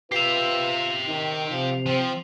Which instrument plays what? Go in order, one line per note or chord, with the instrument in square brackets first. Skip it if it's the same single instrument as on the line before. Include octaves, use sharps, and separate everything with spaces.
[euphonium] F4 [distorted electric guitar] G4 E5 [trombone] B4 [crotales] C7 F7
[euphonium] D#3 [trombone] D#4
[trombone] C3 [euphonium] F3
[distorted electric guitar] F3 [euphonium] C4